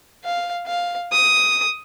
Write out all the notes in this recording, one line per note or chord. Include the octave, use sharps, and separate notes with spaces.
F5
F5
D#6